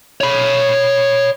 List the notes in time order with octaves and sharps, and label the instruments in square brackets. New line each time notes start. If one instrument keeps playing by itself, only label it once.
[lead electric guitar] C#5 B5